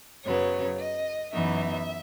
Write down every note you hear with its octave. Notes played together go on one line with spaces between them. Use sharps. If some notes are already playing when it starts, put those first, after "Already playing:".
F#2 C#3 F#3 B3 C#5
D#5
F#2 E3 B3 D#4 E5